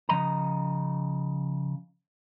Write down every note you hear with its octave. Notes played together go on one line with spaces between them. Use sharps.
C#3 F3 D#5 A#5